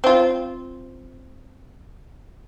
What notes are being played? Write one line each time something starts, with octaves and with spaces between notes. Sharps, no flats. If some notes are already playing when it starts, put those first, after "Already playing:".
C4 F4